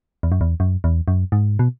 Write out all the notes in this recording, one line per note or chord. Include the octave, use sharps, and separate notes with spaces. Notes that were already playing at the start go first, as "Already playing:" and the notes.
E2
F#2
E2
F#2
E2
F#2
G#2
B2